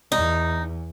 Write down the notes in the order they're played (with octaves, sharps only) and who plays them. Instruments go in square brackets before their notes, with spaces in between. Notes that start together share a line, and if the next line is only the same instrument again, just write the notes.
[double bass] E2 [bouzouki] D#4